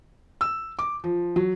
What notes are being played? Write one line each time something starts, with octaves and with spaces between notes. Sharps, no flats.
E6
D6
F3
F#3